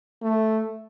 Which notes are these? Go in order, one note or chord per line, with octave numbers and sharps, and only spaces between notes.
A3